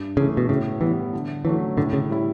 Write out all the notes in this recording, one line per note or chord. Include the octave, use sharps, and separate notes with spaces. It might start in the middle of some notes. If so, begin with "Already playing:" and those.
Already playing: G2
C#3 E3 A3
B2
A2 C#3
E3 G3 B3
D3
E3 F#3 A3 C#4
A2 D3
C#3
G3 C#4 E4